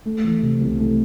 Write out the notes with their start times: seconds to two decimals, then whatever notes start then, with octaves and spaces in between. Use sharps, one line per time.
0.05 A3
0.24 E3
0.42 C3
0.61 C2
0.80 A3